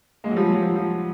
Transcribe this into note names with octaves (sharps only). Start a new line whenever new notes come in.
G#3 A#3
F#3
F3 G3
F#3
F3
F3